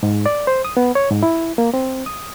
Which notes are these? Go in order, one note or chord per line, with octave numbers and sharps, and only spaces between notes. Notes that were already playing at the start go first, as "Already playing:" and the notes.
G#2
D5
C5
D#6
B3
C#5
G#2
E4
A#3
C4
D#6